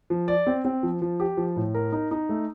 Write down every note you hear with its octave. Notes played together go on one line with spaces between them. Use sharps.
F3
D5
C4
C4
F3
F3
G4
F3
A2
A#4
D#4
D#4
A3